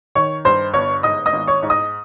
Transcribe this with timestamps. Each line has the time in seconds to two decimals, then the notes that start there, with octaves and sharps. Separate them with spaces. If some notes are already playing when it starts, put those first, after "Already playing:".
0.15 D#3 C#5 C#6
0.45 G2 C5 C6
0.74 G1 C#5 C#6
1.03 G#2 D#5 D#6
1.26 D#5 D#6
1.33 G#1
1.47 C#5 C#6
1.63 G#2
1.70 D#5 D#6